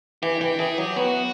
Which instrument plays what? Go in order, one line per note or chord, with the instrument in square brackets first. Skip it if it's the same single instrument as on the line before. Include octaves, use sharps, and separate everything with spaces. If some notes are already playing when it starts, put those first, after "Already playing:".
[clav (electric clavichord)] E3 [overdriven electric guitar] G4
[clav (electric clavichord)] E3 [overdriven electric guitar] G4
[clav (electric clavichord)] E3 [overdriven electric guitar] G#4
[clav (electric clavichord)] F#3 [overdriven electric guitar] G4
[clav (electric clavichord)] B3 [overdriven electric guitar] F#4